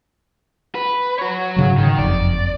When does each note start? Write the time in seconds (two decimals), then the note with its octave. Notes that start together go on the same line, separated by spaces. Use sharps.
0.75 B4
1.19 F#4 C#5
1.56 G#2 C#3 F#3
1.78 D#3
1.98 F#1 F2 D5